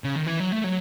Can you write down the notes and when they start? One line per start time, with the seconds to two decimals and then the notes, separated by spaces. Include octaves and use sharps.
0.04 C#3
0.16 D#3
0.26 E3
0.40 F#3
0.52 A3
0.64 F#3